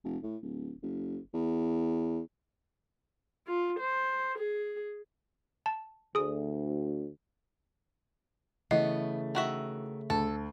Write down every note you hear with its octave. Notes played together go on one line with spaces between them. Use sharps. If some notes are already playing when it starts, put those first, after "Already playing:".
F1
A2
D1
F#1
E2
F4
C5
G#4
A5
D2 G#4 D#6
C#3 E3 A3 B3 D#5
D#3 F#4 E5
D2 A4